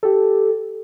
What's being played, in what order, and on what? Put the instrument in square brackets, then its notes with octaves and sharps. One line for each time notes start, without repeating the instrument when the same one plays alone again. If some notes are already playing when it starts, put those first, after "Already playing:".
[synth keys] G4 A4